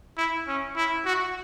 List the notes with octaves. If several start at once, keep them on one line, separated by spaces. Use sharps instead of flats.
E4
C#4
E4
F#4